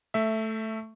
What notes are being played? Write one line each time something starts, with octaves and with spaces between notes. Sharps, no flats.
A3 E5